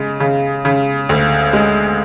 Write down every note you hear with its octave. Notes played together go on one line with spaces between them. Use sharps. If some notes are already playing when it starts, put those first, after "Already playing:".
Already playing: C#3 G#3
C#3
C#3
D2
G#3